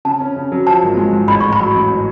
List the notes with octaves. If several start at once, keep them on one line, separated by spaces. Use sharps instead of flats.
C#3 A5
C#4
C#3
F#3
F3 A5
G#1
G#3
G#2
A1 B5
A1 C#6
B5
F#3
A1